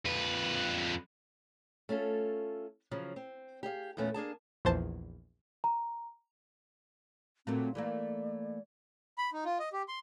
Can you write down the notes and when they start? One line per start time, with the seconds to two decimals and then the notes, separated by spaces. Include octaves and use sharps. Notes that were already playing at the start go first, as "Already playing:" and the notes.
0.05 F2 B4
1.89 A3 C#4 F4 A4
2.91 C#3 F3 F#3
3.16 C4
3.63 G4 G#4 D#5 F5
3.97 E2 A#2 A3 B3 C#4
4.14 A#3 D4 G#4 A5
4.65 A#1 E2 C5 A5
5.64 A#5
7.47 A#2 F#3 A3 C4
7.75 E3 A3 A#3 D5
9.18 B5
9.33 D#4
9.44 F4
9.59 D#5
9.73 G4
9.88 C6